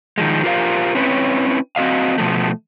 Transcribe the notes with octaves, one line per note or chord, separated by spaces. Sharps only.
D#3 F3 G#3
F4 G4 A#4 C5 D#5 F5
C4 C#4 E4 B4 C#5
C4 F#4 D#5 F5
B2 F3 A3